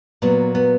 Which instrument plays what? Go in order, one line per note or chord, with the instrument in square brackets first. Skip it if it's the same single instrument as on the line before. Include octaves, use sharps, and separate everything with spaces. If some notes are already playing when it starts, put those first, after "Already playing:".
[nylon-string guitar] A#2 F#3 B3
B3